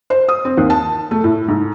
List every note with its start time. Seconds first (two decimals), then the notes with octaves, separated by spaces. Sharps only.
0.10 C5
0.29 D#6
0.45 C4
0.57 D#2
0.70 A5
1.11 A3
1.24 A2
1.48 G#2